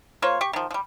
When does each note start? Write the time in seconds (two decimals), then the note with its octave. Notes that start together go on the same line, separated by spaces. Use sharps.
0.22 A#3 F4 C5 C#5
0.41 G4 C#6
0.53 D#3 F3
0.71 F3 G3